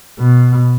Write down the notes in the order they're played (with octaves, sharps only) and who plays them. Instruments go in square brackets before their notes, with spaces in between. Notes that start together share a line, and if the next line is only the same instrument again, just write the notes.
[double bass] B2